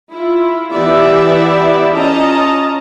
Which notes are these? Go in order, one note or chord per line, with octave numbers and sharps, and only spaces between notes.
E4 F4
E3 B3 E4 G4 D5 E5
C#4 F4 D#5 A5 A#5